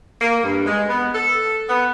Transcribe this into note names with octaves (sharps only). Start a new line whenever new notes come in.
A#3
G2
G#3
B3
A4
B3